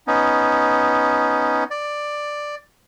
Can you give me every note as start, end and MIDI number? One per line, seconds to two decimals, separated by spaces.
0.07 1.64 59
0.07 1.64 61
0.07 1.64 63
1.71 2.55 74